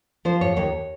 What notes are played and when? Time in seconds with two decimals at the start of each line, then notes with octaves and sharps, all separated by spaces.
0.25 F3 C5
0.41 G#2 C#5
0.56 D#2 C#5